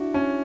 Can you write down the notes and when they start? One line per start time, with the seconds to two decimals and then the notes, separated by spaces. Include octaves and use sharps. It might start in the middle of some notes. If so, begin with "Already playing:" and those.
Already playing: D4 E4 F#4
0.14 C#4